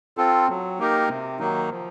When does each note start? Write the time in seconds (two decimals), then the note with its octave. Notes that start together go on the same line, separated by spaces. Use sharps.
0.17 C4 F4 A4
0.49 F#3
0.79 A#3 D#4 G4 A#4
1.09 C3
1.39 D#3 F#3 A#3 D#4
1.70 F3